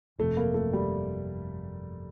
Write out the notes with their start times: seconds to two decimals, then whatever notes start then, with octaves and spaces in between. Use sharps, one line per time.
0.18 G1 F2 C3 A3
0.37 A#3
0.54 A3
0.73 G3